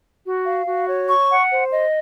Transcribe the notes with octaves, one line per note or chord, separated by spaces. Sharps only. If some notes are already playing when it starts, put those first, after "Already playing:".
F#4
F5
F#4
C#5
C#6
F#5
C5
D#5